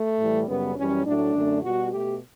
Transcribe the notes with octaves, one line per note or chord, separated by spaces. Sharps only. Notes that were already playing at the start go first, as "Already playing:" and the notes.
Already playing: A3
A2 E3 G3
F#2 C#3 G3 B3
F#2 E3 G3 C#4
A2 F#3 A3 D4
F#2 D3 A3
B2 G3 F#4
B2 A3 G4